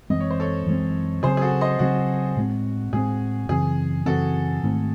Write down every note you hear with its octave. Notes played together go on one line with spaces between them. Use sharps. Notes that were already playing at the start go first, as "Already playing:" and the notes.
F#2 E3 G#3 C4 D#5
C#5
C5
A4 C#5
F#2 E3 G#3 C4
C#3 F#3 C4 G#4 C5
G#4
F#4 A4
C5 D#5
C#3 F#3 C4 F#4
A2 G#3 C4
A2 G#3 C4 G#4
F#2 C#3 E3 C4 G#4
F#2 C#3 E3 C4 F#4 A4
G#2 D#3 A3 C4